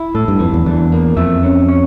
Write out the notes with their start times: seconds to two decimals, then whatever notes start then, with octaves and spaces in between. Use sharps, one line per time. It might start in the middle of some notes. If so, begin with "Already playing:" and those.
Already playing: E4
0.15 A2 A4
0.28 G2
0.40 F2 E3
0.54 E2
0.66 E2 D4
0.92 A#3
1.17 F2 E5
1.43 C#4
1.69 C#5